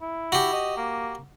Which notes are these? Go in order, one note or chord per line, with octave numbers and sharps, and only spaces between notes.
E4
F#4 G4
D#5
A#3